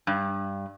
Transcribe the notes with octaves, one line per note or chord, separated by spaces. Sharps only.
G2